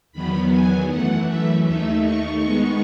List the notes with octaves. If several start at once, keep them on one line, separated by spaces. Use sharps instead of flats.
E2 D#3 F#3 B3 B5
G#5
F#2 E3 A3 F#5
E5
D#2 D#3 A3 D#4 E5
C#6
D#3 G#3 B3 D#4